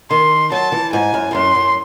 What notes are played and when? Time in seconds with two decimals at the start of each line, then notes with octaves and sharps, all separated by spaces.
0.10 D#3 C6
0.52 F#3 A5
0.72 E3
0.93 G#2 G#5
1.14 F#2
1.31 G#2
1.35 F#2 C6
1.55 F#2